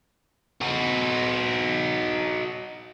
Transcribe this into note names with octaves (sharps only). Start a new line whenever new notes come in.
D#4 F#4